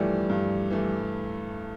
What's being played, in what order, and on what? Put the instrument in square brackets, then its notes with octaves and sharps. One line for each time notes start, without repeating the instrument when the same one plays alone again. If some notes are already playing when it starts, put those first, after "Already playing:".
Already playing: [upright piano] G2 E3 A3 [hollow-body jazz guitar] F3 G3
[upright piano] G2
E3 A3